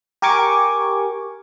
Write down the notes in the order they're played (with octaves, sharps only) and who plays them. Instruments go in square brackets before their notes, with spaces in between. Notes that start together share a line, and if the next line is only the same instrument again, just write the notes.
[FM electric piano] G4 A#4 G#5 C#6 D6